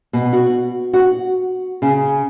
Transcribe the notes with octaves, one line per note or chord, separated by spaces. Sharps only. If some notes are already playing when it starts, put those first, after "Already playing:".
B2
F#4
F#4
C#3